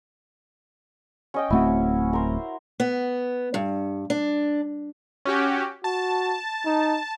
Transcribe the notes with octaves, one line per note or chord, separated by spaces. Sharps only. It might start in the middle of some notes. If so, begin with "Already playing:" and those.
C#4 D#5 G5
D1 A3 C4 E4 F#4
A#4 C5
B3
G2
D4
C#4 F#4 G4
F#4 A5
D#4